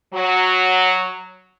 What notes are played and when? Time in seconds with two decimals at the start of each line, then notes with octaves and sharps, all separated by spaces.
0.13 F#3